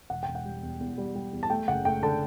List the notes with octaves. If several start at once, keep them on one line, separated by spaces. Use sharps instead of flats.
E1 F#5
G5
E1
F#5
G3
E2
E2
G3
G3
E2
A5
A3 G5
F#1 F#5
A3 G5
D3 A5